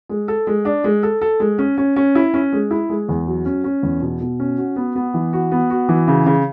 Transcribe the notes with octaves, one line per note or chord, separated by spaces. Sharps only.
G#3
A4
G#3
D4
G#3
A4
A4
G#3
C#4
C#4
C#4
E4
C#4
G#3
E4
G#3
E2
F#3
C#4
C#4
E2
B2
B2
C#4
F#4
B3
B3
E3
F#4
B3
F#4
E3
C#3
C#3